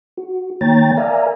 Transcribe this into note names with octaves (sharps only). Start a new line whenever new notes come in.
F#4
D#3 A#3 C#5 G5 A#5 A6
A#4 D5 E5 F5 G#5 A#5